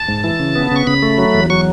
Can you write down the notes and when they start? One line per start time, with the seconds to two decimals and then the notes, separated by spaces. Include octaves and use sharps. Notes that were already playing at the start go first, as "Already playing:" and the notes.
Already playing: A5
0.08 G#2
0.24 E3
0.40 C#3
0.56 B3
0.71 C#3 C#6
0.87 C#3 B5
1.02 A3
1.18 F#3
1.34 E2
1.50 F#3 C#6